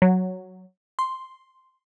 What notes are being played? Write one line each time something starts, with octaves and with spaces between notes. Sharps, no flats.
F#3
C6